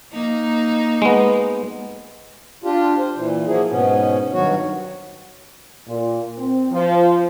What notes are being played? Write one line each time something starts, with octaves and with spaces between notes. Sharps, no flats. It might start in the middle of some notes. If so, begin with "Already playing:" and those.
A#3 D#4
G#3 B3
D4 F4 G4
C5
A#2 E3
F3 F#3 A#3 G#4
G#2 B2 B3 C#4
G2 D#3 F#3 F#4 C#5
A#2
C4
F3